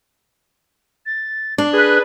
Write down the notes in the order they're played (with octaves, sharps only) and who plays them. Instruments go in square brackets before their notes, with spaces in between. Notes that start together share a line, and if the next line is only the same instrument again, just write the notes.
[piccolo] A6
[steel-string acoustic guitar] D4 [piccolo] D6
[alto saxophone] G#4 [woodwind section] B4 [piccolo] F#6